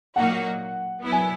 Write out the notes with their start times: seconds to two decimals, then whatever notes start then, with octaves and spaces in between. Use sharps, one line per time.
0.16 A#2 F#3 A#3 D#4 F#4 F#5
1.02 F#3 B3 E4
1.12 G#5